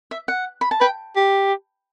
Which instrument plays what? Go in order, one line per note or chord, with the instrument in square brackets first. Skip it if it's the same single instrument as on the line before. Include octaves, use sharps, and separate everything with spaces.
[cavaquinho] E5
F#5
B5
A5
[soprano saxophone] B4 [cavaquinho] G5
[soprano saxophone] G4